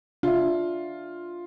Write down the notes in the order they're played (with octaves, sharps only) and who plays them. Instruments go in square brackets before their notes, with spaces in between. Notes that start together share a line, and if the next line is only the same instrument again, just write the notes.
[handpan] D4 E5 [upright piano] F4